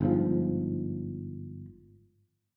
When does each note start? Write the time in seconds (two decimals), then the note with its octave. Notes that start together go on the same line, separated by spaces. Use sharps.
0.01 G1 G#2 F3